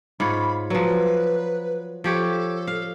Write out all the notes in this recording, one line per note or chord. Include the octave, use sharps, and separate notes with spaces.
G#2 F4 C#5 B5
F3 F#3 B4
F3 G4 A4 C#5
F5